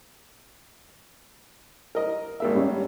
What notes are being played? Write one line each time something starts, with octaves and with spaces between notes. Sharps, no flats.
A#4 D#5
G#1 A#3 E5
G3 C#4